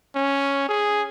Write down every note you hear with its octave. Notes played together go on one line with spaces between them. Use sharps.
C#4
G#4